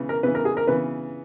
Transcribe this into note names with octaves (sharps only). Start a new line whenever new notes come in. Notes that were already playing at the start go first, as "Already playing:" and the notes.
Already playing: C#3 E3 B3
A#4
C#3 E3 B3 B4
A#4
G#4
A#4
C#3 E3 B3 B4